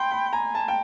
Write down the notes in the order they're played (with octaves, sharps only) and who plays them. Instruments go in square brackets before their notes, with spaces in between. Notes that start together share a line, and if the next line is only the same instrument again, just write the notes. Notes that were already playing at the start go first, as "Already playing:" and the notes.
Already playing: [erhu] G5 [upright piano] B5 C6
[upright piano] B5
[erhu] G#5 [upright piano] A#5
[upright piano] A5
G5